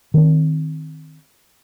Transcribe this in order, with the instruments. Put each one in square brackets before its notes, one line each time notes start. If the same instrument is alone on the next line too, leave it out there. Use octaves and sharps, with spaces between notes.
[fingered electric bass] D#3 C4